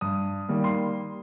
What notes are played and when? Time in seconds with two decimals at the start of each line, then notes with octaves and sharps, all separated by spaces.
0.01 G2 D#6
0.49 D#3 G3 A#3
0.64 C6